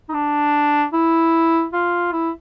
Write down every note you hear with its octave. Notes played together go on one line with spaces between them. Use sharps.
D#4
D4
E4
F4
E4